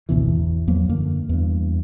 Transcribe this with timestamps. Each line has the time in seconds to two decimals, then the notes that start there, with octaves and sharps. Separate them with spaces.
0.09 G#1 D2 B2 E3
0.28 E2
0.67 E2 F3 F#3 A#3
0.89 F#2 D3 A#3
1.29 E2 G2